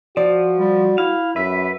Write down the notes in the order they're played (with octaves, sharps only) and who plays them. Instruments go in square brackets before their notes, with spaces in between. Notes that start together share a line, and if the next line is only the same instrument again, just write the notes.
[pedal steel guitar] F3 [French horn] F#4 [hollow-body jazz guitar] D5
[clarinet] G3
[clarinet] E4 [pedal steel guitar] F5
[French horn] F#2 [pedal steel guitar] B4 [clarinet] E5